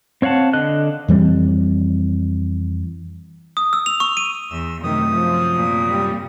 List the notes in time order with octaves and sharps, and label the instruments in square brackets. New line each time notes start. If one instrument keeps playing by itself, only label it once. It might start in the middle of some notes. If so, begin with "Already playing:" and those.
[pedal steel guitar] C4 C#5 F5 F#5 A5
D3 D#5 F#6
[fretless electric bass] F2 E3 G3 C4
[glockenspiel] D#6
E6
F7
C#6
D#7
[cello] E2 [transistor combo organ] E6
[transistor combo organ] F#2 C3 [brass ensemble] D#3 [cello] A3 [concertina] D#6
[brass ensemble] F3
[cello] A#2
[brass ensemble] G3